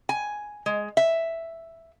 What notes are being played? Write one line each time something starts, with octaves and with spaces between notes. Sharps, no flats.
G#5
G#3
E5